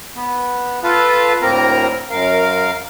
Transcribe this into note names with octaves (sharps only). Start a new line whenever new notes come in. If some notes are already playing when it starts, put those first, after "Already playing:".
B3
F4 A4 B4 F5
D2 A2 A#3 C4 A#4 A#5
F#2 A#4 F5